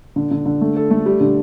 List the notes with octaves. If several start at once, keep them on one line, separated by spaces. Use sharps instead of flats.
D3
D3
D3
A3
A4
A3
G3
D3